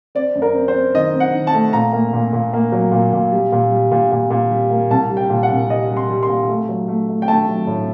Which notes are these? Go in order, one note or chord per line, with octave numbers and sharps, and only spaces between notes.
C4 D5
F#2
A#4
C4
C5
C4
D#3 D#5
C4
F#5
D#3
A5
A3
A#2 A#5
A#3
A#2
A#2
A#3
F#3
A#2
A#2
G3
A#2
G3
A#2
A#2
A#2
G3
A#3
C2 A5
G3
G5
A#2
F#5
C2
G3 D#5
G3
C6
G3
C6
A#2
A3
F#3
A3
A3
G5
A3 A5
F#3
A2